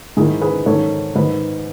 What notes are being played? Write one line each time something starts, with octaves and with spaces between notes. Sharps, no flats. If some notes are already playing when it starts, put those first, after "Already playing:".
G#2 D#3 E4 G#4
G#4 B4
G#2 D#3 A4 C#5
G#2 D#3 B4 D#5